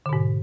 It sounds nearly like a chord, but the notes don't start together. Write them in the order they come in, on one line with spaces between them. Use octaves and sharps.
D3 B2 G#2